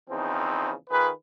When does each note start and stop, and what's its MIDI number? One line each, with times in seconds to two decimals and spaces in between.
0.10 0.72 40
0.10 0.72 49
0.10 0.72 53
0.10 0.72 60
0.10 0.72 63
0.90 1.09 51
0.90 1.09 65
0.90 1.09 68
0.90 1.09 71